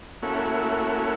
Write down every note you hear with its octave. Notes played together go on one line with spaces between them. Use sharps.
A3 A#3 C#4 E4 F#4